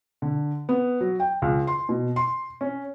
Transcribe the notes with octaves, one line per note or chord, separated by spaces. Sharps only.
D3
B3
F#3
G5
C#2
C6
B2
C6
C#4